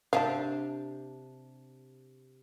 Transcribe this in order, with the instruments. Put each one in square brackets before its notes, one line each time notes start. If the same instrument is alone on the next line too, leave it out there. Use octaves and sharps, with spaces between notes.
[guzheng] C3 D4 G4 [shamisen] F5 G#5 A5